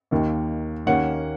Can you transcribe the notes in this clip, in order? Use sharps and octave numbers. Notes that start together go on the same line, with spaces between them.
D#2 D#3 A#3
D#2 D#3 A#3 C#4 F#5